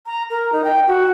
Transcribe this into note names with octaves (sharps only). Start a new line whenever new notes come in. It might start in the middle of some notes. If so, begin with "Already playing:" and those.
A#5
A#4
D#4
G5
F#4